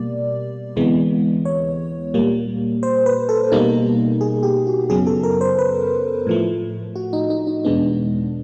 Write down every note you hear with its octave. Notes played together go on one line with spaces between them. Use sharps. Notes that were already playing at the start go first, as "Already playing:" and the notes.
Already playing: B2 G3 A#3 D5
D2 C3 E3 G#3 B3
C#5
A#2 G3 A#3
C5
B4
A4
B2 G3 A#3 D#4
G#4
G4
F#4
F#2 C#3 F#3 B3 G#4
A4
A#4
C5
B4
A2 F3 A3
F#4
D#4
D#4
D#4
E2 B2 G#3 B3 D4